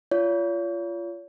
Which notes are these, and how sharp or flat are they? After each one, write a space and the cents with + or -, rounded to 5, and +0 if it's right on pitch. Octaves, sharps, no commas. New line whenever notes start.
F4 -20 C#5 +40